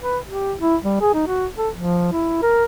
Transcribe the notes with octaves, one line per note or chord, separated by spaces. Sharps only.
B4
G4
E4
G3
G#4
D#4
F#4
A4
F3
E4
A#4